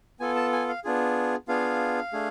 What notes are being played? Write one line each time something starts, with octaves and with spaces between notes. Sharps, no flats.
B3 F4 A4 G#5
A5
G#5
F5
B3 D4 F4 G#4
B3 D4 F4 G#4 F5
A3 D4 G#4